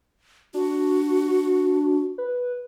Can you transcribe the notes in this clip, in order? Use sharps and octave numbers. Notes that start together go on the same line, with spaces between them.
D4 F#4
B4